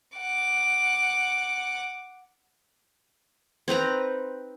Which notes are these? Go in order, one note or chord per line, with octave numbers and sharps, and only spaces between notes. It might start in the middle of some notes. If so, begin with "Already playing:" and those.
F#5 D6
C4 D#4 B4 A#5